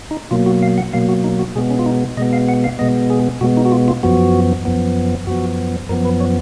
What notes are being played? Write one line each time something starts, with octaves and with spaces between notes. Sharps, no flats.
D#4
B2 F#3 A#3 F4
F#4
F5
F#5
B2 F#3 A#3 F5
F#4
D#4
F#4
B2 G#3 B3 G#4
C#4
F4
D#4
B2 G#3 B3 D#5
F5
F#5
F5
B2 G#3 B3 D#5
G#4
B2 G#3 B3 F#4
D#4
F#4
F4
F4
F#2 F3 B3 F#4
F#2 F3 B3
F#2 F3 B3 F#4
F#2 F3 B3 A#4
B4
C#5